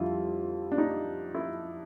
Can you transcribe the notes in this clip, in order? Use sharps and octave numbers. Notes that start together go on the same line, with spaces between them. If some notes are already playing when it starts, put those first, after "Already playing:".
Already playing: F2 D3 G3 E4 F4
D4
D#4
E4